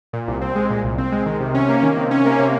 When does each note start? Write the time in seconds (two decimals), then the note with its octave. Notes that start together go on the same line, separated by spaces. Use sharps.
0.13 A#2
0.28 C2
0.41 C4
0.55 G#3
0.70 A#2
0.84 C2
0.98 C4
1.12 G#3
1.26 D#3
1.40 C3
1.54 C#4
1.69 A#3
1.83 D#3
1.97 C3
2.11 C#4
2.25 A#3
2.39 C3